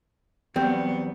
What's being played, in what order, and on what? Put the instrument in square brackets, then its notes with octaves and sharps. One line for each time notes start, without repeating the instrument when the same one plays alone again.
[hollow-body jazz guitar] E2 G3 C4 [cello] F#3 B3